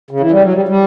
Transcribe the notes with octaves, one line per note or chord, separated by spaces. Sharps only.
C#3
E3
G3
F#3
G3
G3